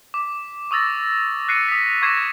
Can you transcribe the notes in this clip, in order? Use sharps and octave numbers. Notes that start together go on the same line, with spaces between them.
D6
C#6 D#6 E6 A6 A#6
F#6 A#6 C7 C#7 D#7
D#6 B6
C#6 D6 G#6 A#6 C7 E7